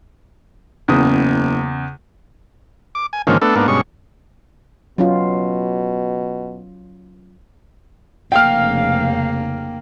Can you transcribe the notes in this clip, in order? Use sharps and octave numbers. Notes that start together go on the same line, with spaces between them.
F#1 E2 C#3 D#6
D6
G#5
G#2 D3 D#3 F3 A#3 C#4
A3 B3 D4 A4
G#2 A#3 B3 D4
G2 B2 G#3 C#4 C#6
B2 F#3 C#4 F4
F1 C#3 A#3 F5 G5 F6